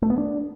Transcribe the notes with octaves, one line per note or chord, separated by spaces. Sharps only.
A3
B3
D4